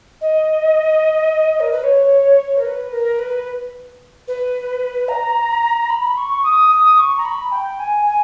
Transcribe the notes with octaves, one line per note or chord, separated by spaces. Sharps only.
D#5
A#4
B4
C#5
A#4
B4
A#4
B4
B4
A#5
B5
C#6
D#6
D#6
C#6
A#5
B5
G5
G#5
G#5